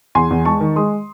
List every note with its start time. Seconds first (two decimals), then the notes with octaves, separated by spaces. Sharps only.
0.15 E2 G#5 C6
0.31 E2
0.45 G#3 A5 C#6
0.60 D#3
0.76 G#3 C6 D#6